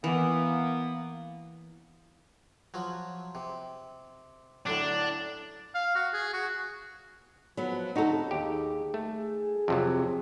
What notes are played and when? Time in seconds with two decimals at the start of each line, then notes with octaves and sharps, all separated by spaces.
0.04 E3 A#3 B3
2.74 F3 F#3
3.35 C3
4.66 A2 D3 F#3 D4
5.74 F5
5.95 F#4
6.13 G#4
6.33 F#4
7.57 F3 F#3 B3
7.96 D2 C3 D#4 F#4 A4 A#5
8.31 D#2 G4 G#4
8.94 A3 G#4
9.68 F2 C3 F#3